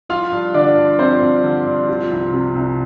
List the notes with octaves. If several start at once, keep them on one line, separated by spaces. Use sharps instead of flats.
F3 F4 F5
G2
D3 D4 D5
G2
F3 C4 C5
G2
D3
G2
F3
C2
C3
C2